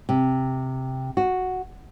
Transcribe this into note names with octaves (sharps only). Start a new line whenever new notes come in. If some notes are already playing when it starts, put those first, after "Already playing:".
C3
F#4